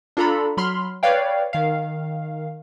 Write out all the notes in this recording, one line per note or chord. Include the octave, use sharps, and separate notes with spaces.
D4 F4 A4 A#5 B5
F#3 B5 C6 F6
B4 C#5 D5 F5 G5
D#3 F5